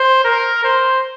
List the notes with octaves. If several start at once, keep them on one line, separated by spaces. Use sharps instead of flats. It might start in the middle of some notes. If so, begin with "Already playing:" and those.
Already playing: C5
A#4
C5